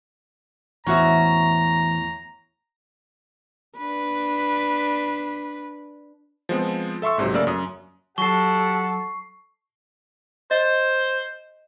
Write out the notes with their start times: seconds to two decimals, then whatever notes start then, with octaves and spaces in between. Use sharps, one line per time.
0.86 E2 A2 E3 C#4 F#4 C5 E5 A#5
3.77 D4 B4
6.49 F3 G#3 B3 C4
7.02 A4 E5 C6 C#6 E6
7.18 A#1 G#2 C3 F#3
7.34 C#3 A3 A#3 D5 E6
7.47 F#2 D#6
8.18 F#3 G4 A4 F#5 C#6 C7
10.51 C5 D#5